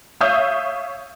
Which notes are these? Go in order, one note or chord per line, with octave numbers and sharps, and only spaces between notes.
C#5 E5 F5 D#6 E6 G6